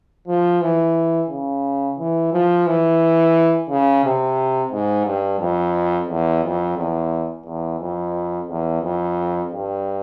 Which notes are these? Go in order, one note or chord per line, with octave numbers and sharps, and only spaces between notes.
F3
E3
C#3
E3
F3
E3
C#3
C3
G#2
G2
F2
E2
F2
E2
E2
F2
E2
F2
G2